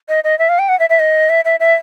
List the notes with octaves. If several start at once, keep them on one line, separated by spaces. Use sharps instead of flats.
D#5
D#5
E5
F5
G5
F#5
E5
E5
D#5
E5
E5
E5